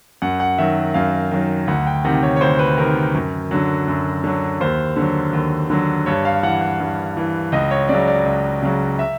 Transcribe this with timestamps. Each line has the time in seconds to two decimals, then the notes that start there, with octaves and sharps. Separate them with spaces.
0.22 F#2 F#5
0.40 F#5
0.58 D#3 F#3 E5
0.94 F#2 F5
1.31 D#3 F#3
1.67 D2 F#5
1.87 G5
2.04 C3 D#3 F#5
2.23 C#5
2.36 C#5
2.41 D2 C5
2.59 B4
2.78 C3 D#3 A#4
3.14 F#2
3.51 D3 F#3
3.88 F#2
4.24 D3 F#3
4.60 D#2 C5
4.96 D3 F#3
5.33 D#2
5.70 D3 F#3
6.06 G2 C#5
6.25 F5
6.43 E3 F#5
6.61 F#5
6.80 G2
7.17 E3
7.52 C#2 D#5
7.71 C#5
7.89 C#3 F#3 D5
8.08 D5
8.26 C#2
8.62 C#3 F#3
8.99 E5